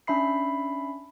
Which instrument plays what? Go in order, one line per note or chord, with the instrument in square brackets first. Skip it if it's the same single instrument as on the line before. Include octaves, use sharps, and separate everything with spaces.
[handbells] C#4 D4 E5 B5 C7